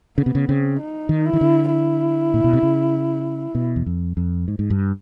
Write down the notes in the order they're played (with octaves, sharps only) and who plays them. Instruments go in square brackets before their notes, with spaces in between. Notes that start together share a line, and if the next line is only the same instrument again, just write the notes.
[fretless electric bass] C#3 [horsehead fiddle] B3
[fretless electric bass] C3
C#3
[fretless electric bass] C#3 [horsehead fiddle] C4
[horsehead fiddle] D#4
[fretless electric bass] D#3
[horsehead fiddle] E4
[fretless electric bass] D#3
D3
[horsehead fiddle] E4
[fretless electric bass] A#2
B2
C3
C#3
B2
E2
F2
F2
G#2
G#2
G2